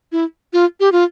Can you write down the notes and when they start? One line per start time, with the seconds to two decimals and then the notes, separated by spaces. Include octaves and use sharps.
0.12 E4
0.53 F4
0.80 G4
0.92 F4